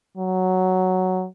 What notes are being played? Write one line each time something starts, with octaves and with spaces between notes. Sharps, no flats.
F#3